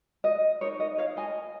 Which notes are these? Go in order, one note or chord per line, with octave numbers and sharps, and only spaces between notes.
D#5
D#4 A#4 C#5
D#5
C#5 F5
D#5 G#5